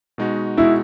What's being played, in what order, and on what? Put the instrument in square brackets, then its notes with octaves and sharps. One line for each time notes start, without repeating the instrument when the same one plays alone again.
[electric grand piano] B2 G#3 D#4 F#4
[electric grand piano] B2 G#3 D#4 F#4 [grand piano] E4